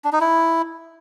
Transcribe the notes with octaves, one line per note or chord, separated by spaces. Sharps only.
D4
D#4
E4